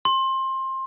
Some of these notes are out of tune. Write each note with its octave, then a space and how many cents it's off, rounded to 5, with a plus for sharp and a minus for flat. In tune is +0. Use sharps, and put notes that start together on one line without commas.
C6 +20